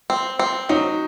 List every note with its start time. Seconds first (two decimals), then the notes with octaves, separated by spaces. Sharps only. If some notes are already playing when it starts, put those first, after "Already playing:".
0.10 C4
0.39 C4
0.69 F#3 D#4